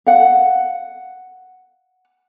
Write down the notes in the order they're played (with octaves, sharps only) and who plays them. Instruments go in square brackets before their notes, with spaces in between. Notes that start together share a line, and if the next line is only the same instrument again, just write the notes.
[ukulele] F5 F#5